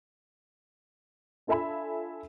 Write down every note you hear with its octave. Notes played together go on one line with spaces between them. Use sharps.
D4 F4 A4 E5 G#5 B5